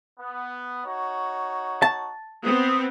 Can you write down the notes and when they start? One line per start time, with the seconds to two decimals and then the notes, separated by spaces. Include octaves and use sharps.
0.20 B3
0.85 D#4 F#4 C#5
1.82 A5
2.44 B3 C4 D#6